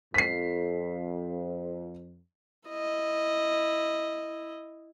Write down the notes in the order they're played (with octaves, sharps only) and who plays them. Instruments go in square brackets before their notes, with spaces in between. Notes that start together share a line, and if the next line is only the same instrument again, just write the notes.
[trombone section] F2 [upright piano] B6 C7
[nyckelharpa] E4 D#5